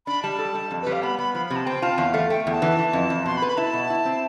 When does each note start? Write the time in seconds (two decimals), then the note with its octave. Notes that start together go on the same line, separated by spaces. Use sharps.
0.07 D4 B5
0.23 G3 A5
0.39 A4
0.55 G3
0.71 F2
0.82 G3 B4
0.92 F5
1.02 B3 B5
1.18 B3 B5
1.34 F3 B5
1.46 C3 B5
1.56 A5
1.66 C4 G5
1.82 F4 A5
1.98 E2 F5
2.14 A3
2.30 A3 G5
2.47 E2 A5
2.62 E3
2.79 E3
2.93 F2
3.10 F2
3.26 B2 C6
3.37 B5
3.42 B4
3.48 B5
3.57 E4 A5
3.73 B2
3.90 E4
4.05 C4